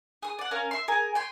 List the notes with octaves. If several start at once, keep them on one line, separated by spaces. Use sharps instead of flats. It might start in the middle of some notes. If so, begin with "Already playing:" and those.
G#4 D#6
D5 F#5
C#4 A#4 F5
E5 C6
G#4 A#4 G#5
G5 G#5 C6